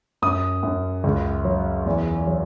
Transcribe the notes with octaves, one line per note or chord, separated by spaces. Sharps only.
F#2 D#6
F#2
C#2
F#3
E2
F#3